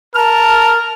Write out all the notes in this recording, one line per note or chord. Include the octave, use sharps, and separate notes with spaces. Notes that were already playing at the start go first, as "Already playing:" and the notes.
A#4 A5 F6